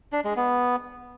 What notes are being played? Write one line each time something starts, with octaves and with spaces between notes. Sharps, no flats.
D4
G#3
B3